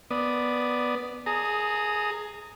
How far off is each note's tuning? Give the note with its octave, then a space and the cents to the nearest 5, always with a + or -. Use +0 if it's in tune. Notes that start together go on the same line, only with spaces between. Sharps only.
B3 +0 D5 +0 D#6 +0
G#4 +15 A#5 -25 D#6 +0